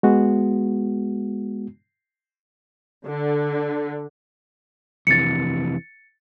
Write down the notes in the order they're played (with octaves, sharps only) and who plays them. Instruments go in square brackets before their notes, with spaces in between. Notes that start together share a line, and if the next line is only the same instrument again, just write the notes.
[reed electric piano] G#3 B3 F#4
[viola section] D3
[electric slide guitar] F2 C3 E3 [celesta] A6 C#7